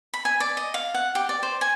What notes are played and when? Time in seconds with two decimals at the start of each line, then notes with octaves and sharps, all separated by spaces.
0.14 B5
0.25 G#5
0.40 D5
0.57 D#5
0.74 F5
0.94 F#5
1.15 G4
1.29 D5
1.43 C5
1.61 G#5